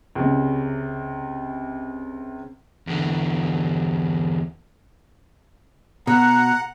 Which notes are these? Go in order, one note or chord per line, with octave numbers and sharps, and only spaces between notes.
C#2 C3
E2 D3
B2 F#5 A#5